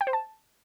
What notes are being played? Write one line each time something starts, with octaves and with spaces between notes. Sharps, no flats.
G5
C5
A5